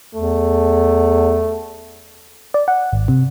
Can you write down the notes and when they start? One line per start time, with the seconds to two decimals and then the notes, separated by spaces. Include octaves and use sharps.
0.15 E2 A3
2.54 D5
2.68 F#5
2.92 G#1
3.08 C3